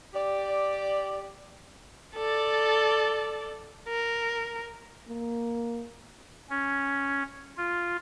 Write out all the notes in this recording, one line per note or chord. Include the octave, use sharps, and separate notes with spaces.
G4 D5
A4 D5
A#4
A#3
C#4
F4